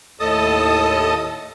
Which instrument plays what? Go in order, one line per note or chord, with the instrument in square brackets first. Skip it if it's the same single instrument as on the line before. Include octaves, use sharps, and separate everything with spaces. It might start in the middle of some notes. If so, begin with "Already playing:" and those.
[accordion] D#2 A2 A4 D#5 A5 D#6